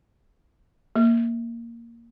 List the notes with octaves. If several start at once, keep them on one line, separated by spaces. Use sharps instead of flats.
A#3